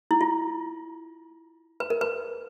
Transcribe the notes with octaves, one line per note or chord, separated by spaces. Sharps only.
E4
F4
B4
A#4
B4